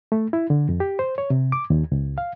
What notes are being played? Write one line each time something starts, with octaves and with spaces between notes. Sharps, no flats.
A3
E4
D3
F2
G4
C5
C#5
C3
D6
D#2
C#2
F5